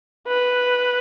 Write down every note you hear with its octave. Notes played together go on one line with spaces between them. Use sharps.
B4